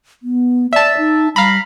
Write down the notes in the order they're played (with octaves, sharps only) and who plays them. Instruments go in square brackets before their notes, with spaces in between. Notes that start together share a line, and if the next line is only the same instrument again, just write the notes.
[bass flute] B3
[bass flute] D5 [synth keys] E5 A5
[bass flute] D#4
[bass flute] G3 [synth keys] F5 A#5 B5